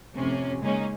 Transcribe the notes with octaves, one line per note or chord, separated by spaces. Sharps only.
F2 A2 C3 C#4
C#3 G#3 A#3 C#4 D#4